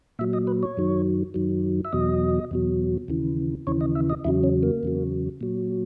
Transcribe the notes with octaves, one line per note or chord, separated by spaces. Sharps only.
A#2 F#3 E5
D#5
B4
C#5
F#2 D#3 F#3
F#2 D#3 F#3
E5
E2 B2 F#3 D#5
E2 B2 F#3
D#2 C#3 E3
D#2 C#3 E3 C#5
D#5
E5
D#5
E2 C#3 F#3 E4
C#4
A#3
E2 C#3 F#3
A#2 F#3